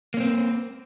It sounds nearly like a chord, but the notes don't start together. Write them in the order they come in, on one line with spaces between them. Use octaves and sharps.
A#3 C#4 C4